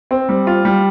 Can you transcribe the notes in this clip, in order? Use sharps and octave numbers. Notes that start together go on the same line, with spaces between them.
C4
G3
F4
G3